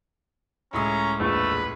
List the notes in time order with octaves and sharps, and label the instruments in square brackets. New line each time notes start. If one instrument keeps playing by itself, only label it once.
[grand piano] C#2 A2 D#6 [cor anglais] C#4 [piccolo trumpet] A#5
[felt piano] A#1 E2 A#2 [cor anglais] A3 [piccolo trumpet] B4